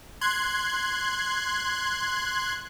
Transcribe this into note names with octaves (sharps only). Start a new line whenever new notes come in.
C6 F#6 G#6